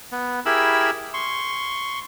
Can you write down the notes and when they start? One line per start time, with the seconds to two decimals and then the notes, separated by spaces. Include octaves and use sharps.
0.12 B3
0.46 E4 G4 G#4 A#4 B5 E6
1.14 C6 C#6